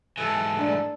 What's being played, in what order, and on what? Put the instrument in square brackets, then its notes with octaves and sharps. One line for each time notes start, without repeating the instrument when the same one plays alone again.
[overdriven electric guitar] G#2 E3 [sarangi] A4
[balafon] A3 D4 D5